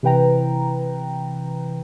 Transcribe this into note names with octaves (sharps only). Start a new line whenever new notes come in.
C3 E3 B4 G5 A#5